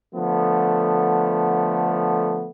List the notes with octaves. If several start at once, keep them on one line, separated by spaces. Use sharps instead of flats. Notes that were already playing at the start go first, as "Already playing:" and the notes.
D3 F3 A3 B3